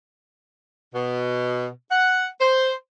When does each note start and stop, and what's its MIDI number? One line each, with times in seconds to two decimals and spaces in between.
0.94 1.67 47
1.91 2.26 78
2.41 2.73 72